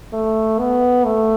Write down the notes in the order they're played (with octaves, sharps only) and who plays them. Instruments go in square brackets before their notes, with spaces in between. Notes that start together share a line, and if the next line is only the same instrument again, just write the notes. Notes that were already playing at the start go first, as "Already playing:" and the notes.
[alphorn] A3
B3
A3